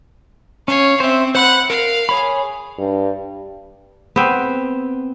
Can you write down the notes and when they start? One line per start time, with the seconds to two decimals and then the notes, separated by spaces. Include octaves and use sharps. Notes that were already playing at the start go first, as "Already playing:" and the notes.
0.68 C#4 C#5 F5
1.00 C4 C5 E5
1.35 C5 F#5 B5 F#6
1.70 A#4 F5
2.09 G#4 C#5 B5
2.78 G2
4.16 B3 C4